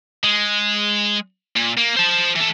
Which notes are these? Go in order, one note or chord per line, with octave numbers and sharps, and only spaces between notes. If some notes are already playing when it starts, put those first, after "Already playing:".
G#3
A#2
A#3
C5 A5
E3 A4